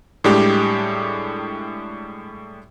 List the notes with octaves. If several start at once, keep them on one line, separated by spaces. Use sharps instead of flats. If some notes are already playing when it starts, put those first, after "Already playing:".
A2 G3 G#3 D4 G4